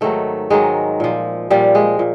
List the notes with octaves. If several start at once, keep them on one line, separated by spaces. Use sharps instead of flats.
G#2 D#3 F#3 A3
G#2 D#3 F#3 G#3
A#2 F3
A#2 F3 G3
G#3
A#2